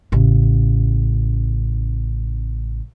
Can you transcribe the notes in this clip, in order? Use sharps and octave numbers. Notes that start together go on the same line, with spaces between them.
A1 C#3